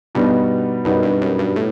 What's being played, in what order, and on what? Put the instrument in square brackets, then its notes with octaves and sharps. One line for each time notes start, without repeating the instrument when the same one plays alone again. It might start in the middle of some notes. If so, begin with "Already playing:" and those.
[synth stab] G2 [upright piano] B2 G3 B3 D#4
[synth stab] F#2 [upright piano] B2 G3 B3 D#4
[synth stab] G2
F#2
G2
A2